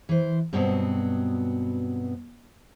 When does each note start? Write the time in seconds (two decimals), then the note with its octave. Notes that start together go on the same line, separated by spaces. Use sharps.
0.09 E3 C5
0.53 G2 B2 F#3 B3 C4 D#5